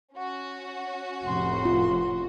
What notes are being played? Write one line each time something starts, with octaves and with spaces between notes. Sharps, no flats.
C#4 F#4
F1 A2 C6
F4